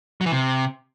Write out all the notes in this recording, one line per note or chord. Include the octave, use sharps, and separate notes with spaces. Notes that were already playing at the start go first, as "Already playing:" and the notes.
F#3
E3
C3